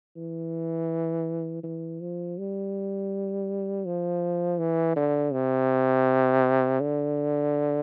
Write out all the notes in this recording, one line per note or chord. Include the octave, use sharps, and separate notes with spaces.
E3
E3
F3
G3
F3
E3
D3
C3
D3